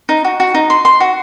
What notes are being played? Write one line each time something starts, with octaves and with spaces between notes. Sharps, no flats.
D#4
F#4
F#4
D#4
C6
C6
F#4